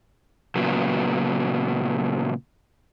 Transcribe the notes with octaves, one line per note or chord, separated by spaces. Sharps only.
A#2 C#3 F#3 B3